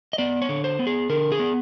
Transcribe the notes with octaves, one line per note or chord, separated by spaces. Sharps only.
D#5
B3 D5
C#5
D3
C5
B3
G#4
D3 A#4
G#4
B3